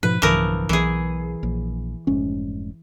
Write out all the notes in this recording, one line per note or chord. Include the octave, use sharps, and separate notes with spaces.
G#2 B2 F3 B4
B1 G2 C#3 E3 F3 A#4
B1 E3 G#4
A#1
F1 G#2 C#4